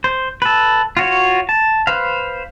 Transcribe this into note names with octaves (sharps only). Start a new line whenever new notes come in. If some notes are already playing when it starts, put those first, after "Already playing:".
C5
A4 B4
F4 F#4 C#5
A5
B4 C5 F5